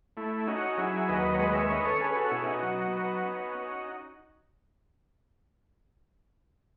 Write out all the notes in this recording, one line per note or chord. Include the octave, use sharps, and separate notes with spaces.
A3 E4
C#4 D#4 F#4
F#3 E4 G#4
D#2 B4 D#5
C#5
G#3 B4 D#5
C#5 E5
C#4 B4 D#5
A4 C#5
C#4 G#4 B4
F#4 A4
B2 E4 G#4
D#4 F#4
F#3
B3
C#4